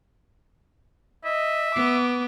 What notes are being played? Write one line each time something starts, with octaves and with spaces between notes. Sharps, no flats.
D#5 E5
B3 D6